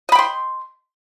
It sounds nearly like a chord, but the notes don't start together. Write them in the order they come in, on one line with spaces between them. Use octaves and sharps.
D#5 B5 G5 C6